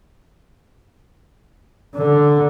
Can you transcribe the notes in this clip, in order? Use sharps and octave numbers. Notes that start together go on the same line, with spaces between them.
D3